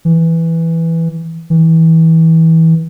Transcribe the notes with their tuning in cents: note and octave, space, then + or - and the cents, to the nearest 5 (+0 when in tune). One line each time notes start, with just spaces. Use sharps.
E3 +0
E3 -25